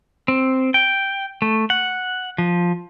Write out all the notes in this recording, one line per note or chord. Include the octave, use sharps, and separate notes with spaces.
C4
G5
A3
F#5
F3